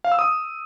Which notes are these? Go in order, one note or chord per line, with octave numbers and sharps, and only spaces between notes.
F5
E6
D#6